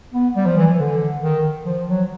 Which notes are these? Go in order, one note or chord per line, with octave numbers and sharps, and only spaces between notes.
B3
G3
F3
E3
D3
D#3
F3
F#3